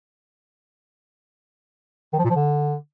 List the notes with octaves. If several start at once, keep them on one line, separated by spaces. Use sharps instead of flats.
D#3
F3
A#2
F3
D3